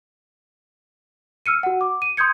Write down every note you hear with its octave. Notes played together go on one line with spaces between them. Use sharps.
E6 F6 C#7 D#7
F#4 F#5
D6
D#7
C6 D#6 G6 G#6 C#7